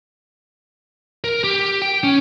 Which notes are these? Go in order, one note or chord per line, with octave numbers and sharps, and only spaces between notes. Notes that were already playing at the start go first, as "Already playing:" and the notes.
A#4
G4
G5
C#4